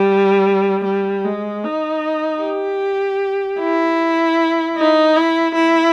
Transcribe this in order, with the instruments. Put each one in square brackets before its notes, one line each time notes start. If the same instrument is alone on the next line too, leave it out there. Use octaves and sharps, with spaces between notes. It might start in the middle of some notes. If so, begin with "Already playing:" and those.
Already playing: [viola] G3
G3
G#3
D#4
G4
E4
D#4
E4
E4